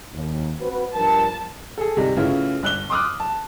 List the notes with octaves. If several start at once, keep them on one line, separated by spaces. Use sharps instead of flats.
D#2
C4 F#4 B4
G2 F3 A#4 A5
G#4 A4
C3 G3 D#4
A2 C#3 B3 C#4 E4 F4
G1 F#6 G7
C6 D6 D#6 F6 F#6
A5